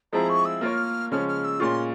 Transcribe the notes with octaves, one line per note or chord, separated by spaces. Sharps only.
F3 G#3 C4 E4 G#4 A#5
C#6
E6
A#3 F4 A#4 C#5 F6
C#3 F3 G#3 C#4 F6
F6
E6
A#2 G#3 C#4 F4 C6 C#6